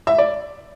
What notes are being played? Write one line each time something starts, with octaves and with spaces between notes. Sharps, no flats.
E5
D5